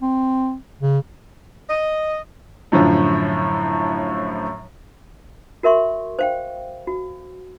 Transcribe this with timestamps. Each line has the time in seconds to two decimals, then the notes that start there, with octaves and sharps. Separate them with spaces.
0.02 C4
0.81 C#3
1.69 D#5
2.72 F#2 A2 D3 F3
5.63 F#4 A#4 E5 C6 C#6
6.19 C5 F5 G5
6.87 F#4